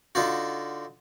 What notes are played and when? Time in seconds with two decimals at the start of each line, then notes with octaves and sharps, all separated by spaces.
0.15 D3 D#4 F4 F#4